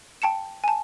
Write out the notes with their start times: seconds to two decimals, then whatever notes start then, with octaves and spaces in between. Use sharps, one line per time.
0.22 G5 A5 C#7 E7
0.64 G#5 A5